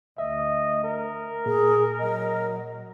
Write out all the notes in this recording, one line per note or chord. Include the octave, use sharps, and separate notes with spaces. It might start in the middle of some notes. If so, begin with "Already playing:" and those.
D2 D#5 E5
A#4
A#2 G#4
F#3 D#5